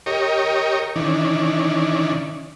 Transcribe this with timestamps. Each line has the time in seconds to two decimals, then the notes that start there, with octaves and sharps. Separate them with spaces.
0.06 G4 A#4 C#5 D#5
0.96 D#3 E3 C#4 D4